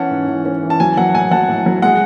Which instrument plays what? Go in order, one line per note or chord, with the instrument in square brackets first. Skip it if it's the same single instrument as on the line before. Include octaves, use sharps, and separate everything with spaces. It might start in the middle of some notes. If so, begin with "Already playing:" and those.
Already playing: [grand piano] E3 C#4 F#5 A5
G#2
E3
C#4
E3
A5
F#3 G#5
F#3 F#5
A2 G#5
F#3 F#5 A5
A2
F#3
G#3 F#5